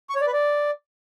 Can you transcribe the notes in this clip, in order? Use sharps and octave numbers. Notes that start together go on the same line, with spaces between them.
C#6
C#5
D5
B4
D5